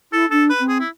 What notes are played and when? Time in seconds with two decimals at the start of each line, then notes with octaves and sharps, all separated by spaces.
0.12 E4 A4
0.31 D4 A4
0.50 B4
0.60 C4
0.68 G#4
0.80 E4